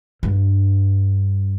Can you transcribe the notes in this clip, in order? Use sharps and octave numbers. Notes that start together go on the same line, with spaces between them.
G2